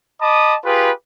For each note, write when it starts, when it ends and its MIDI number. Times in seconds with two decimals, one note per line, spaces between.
0.21 0.56 75
0.21 0.56 81
0.21 0.56 83
0.21 0.56 86
0.21 0.56 87
0.65 0.91 65
0.65 0.91 67
0.65 0.91 68
0.65 0.91 71